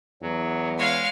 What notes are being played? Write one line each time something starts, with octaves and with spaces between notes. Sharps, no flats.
E2 F#3
G#3 C#5 F5